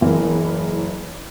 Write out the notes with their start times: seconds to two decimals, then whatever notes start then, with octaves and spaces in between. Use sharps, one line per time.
0.01 F#1 E3 A#4